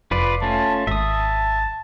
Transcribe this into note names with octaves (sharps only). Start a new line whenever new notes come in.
F1 F4 B4 D5
A3 C#4 F4 A5
G#1 E5 A5 D#6